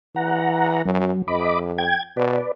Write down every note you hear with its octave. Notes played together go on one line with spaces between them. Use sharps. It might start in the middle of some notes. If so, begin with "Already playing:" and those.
E3 F#5 A#5
F#2 F#3
F2 D#5 B5 D6
G5 G#6
B2 B4 D5